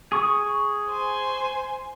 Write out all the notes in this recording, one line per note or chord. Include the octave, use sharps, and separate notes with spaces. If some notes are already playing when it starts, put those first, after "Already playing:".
G#4 C#6 D#6
C5 G#5